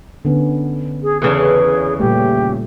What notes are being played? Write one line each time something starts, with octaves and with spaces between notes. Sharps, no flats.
D3 B3 C#4
G#4
E2 C#3 E3 G#4 A4
A#2 G3 A3 G4